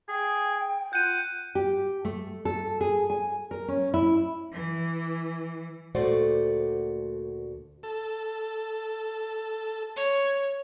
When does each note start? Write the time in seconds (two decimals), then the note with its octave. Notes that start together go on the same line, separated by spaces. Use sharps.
0.09 G#4 G5
0.93 F4 F#5 G6 D#7
1.55 G4
2.05 A3
2.45 A4
2.81 G#4
3.10 G#5
3.51 A#4
3.68 C#4
3.94 E4
4.52 E3
5.95 D2 A#2 A3 F#4 C5 D5
7.83 A4
9.96 C#5